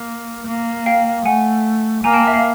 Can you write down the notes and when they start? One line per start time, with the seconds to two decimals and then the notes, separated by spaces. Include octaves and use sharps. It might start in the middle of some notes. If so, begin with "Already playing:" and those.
Already playing: A#3
0.46 A#3
0.86 F5 G5
1.25 A3 F#5 G#5
2.04 A#3 G#5 A#5
2.14 G5 A5
2.27 E5
2.34 F5